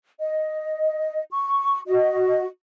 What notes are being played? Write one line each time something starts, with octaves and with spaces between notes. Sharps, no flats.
D#5
C#6
F#4 D#5